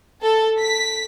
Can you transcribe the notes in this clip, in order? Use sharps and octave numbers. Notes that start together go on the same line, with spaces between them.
A4
B6